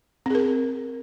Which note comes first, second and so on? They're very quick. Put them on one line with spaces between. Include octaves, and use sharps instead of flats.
C4 G#4 A#4